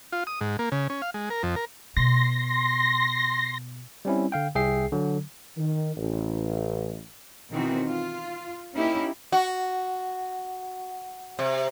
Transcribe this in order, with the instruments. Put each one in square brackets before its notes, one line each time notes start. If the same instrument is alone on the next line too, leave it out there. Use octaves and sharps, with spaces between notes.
[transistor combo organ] F4
D#6
G#2
A#3
C#3
C#4
F5
G#3
A#4
F2
A#4
[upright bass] B2 [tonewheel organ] C6 A#6
[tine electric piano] G3 C4 C#4 E4
D3 F5 G5
C2 G#4 E5 G5 C7
D3 F#3
[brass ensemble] D#3
A1
[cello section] B2 D#3 E3 C4 D#4 F#4
F4
A#3 C#4 D#4 E4 G4
[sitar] F#4
C3